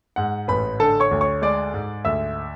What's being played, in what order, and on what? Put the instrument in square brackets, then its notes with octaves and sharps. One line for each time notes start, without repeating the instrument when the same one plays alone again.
[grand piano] G#2 F#5
A1 B4 B5
D3 A4 A5
C#5 C#6
D2
C#5 C#6
G#3 D5 D6
G#2
D2 E5 E6